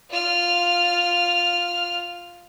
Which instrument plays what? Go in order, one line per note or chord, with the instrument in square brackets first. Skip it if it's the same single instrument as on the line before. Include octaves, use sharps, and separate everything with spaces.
[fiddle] F4 F6